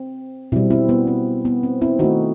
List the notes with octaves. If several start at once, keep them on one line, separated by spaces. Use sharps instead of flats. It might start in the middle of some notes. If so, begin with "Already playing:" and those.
Already playing: C4
B2 G3 C4 E4
C4 E4
B3
C4
B3
C4
C4 E4
D#3 A3 D#4 F#4